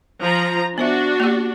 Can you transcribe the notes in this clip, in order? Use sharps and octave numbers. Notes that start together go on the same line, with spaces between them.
F3 A#5
B3 D4 F#4 C5 E5
A#3 G4